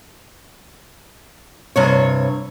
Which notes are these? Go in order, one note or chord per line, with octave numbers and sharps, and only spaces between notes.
G2 C3 C#5